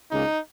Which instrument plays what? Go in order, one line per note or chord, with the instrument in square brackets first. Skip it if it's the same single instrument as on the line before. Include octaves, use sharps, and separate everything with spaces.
[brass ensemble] C#2 C#3 A#3 D#4